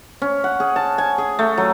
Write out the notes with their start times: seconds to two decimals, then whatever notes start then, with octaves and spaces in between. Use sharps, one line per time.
0.22 C#4
0.44 F#5
0.60 G#4
0.76 A5
0.98 G#5
1.18 G#4
1.39 A3
1.58 F#3